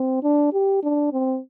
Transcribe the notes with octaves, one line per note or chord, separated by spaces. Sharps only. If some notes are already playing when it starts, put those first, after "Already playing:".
Already playing: C4
D4
G4
D4
C4